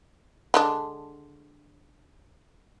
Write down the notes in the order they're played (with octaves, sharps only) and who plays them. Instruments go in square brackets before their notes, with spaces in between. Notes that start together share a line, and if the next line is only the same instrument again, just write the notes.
[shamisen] D3 G#3 D4